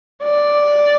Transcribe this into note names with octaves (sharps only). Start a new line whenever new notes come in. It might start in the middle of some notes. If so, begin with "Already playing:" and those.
D5